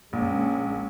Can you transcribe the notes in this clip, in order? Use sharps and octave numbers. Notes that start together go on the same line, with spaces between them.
A#1 G#3 C#4